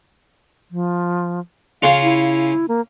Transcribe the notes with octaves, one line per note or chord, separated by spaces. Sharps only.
F3
C#3 C#4 F4 F5
E4
A#3